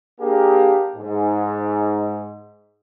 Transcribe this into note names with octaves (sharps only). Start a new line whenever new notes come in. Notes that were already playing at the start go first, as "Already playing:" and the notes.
A#3 D4 G4 G#4
G#2